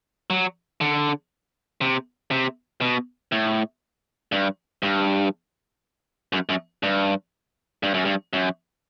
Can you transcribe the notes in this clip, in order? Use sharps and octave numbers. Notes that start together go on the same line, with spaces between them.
F#3
D3
C3
C3
B2
A2
G2
G2
F#2
F#2
G2
G2
F#2
G2
F#2